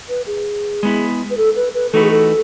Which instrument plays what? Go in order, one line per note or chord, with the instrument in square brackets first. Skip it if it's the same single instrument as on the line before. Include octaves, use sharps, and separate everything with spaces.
[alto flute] B4
G#4
[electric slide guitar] G#3 B3 E4
[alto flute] B4
A4
B4
B4
[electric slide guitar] E3 A3 D#4 F#4 B4 [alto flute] A4
[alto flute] G#4
A4